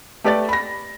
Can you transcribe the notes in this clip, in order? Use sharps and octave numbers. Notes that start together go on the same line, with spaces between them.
A3 G4 B4 D5 D6 A6
B5 A#6